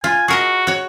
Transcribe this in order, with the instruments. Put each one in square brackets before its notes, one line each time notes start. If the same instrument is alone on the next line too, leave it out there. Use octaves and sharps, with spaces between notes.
[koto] F4 [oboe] G#5
[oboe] F#4 [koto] G#4 A#4 D#5
[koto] F#4 C#5